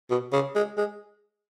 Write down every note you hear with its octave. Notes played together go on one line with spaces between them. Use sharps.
B2
C#3
G#3
G#3